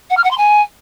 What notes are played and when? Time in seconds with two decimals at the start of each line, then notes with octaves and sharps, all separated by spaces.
0.10 F#5
0.17 F6
0.24 F#5
0.31 C6
0.38 G#5